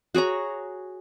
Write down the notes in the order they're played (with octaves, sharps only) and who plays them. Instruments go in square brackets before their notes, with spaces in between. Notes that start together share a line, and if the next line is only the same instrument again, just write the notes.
[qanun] F#4 G#4 C#5 A#5